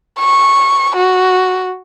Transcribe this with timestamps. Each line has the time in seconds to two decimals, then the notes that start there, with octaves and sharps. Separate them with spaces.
0.20 C#6
0.96 F#4